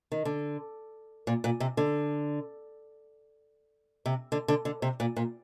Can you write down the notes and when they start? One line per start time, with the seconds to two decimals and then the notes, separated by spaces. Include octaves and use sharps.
0.12 D#3
0.25 D3
1.27 A#2
1.44 A#2
1.60 C3
1.77 D3
4.06 C3
4.32 D3
4.48 D3
4.65 D3
4.82 C3
5.00 A#2
5.16 A#2